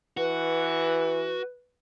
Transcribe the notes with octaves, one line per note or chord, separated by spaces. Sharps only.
E3 F#4 B4